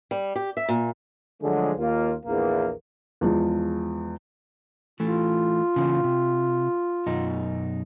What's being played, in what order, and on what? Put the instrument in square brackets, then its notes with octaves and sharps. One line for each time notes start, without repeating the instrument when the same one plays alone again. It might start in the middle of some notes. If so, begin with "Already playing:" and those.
[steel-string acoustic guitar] G3
G4
E5
A#2
[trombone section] D3 F3 F#3 G#3 A3 G#4
D#2 A#3 F4
A#1 E2 A#3
[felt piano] E2 F3 G#3
[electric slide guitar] E3 A3 [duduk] F4
[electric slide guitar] C#3 E3 A#3
C3
F#2 B2 D#4